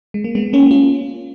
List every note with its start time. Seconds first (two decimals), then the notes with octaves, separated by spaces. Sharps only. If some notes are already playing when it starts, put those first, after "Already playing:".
0.14 G#3
0.24 A#3
0.35 G#3 B3
0.53 A#3 C#4
0.71 C#4 F4